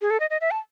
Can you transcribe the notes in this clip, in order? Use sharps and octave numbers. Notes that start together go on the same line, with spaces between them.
G#4
A4
D#5
D#5
E5
A5